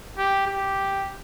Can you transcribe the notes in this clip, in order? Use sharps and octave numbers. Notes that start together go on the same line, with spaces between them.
G4
G4